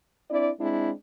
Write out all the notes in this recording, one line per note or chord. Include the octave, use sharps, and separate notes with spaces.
C4 D4 E4 D5
G#3 C4 D4 E4